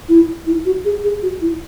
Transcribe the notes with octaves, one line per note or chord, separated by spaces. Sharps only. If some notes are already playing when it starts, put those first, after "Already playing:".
E4
E4
F#4
G#4
G#4
F#4
E4